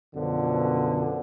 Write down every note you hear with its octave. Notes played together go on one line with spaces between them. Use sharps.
F#2 B2 D3 F3